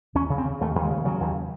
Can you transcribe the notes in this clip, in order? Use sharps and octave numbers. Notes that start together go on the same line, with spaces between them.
D#2 C#4
C#3
C4
C#3
D#2 A3
D#2
G#3
C#3
C#3 F#3
D#2